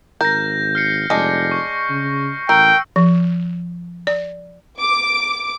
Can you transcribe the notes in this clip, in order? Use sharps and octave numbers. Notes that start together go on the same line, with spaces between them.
G#1 A#4 G6 A#6
F6 C7 C#7
F1 G#3 D4 A#6
C#6
C#3
A1 A#4 G5 E6
F3
D5
D6